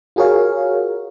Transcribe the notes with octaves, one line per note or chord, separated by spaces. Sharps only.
F4 F#4 G#4 A#4 C#5 F5